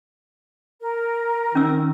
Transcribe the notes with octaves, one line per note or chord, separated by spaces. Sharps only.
A#4
D#3 C#4 E6